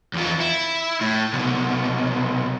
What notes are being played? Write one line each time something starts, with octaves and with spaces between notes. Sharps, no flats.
E2 F4
E4
A2
C2 B2